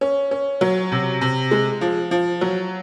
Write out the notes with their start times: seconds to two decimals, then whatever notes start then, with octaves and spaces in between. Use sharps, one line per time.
0.01 C#4
0.31 C#4
0.61 F#3
0.92 C3
1.21 C3
1.51 G#3
1.81 F3
2.11 F3
2.41 F#3